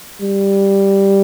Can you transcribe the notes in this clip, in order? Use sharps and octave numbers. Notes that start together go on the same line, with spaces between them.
G3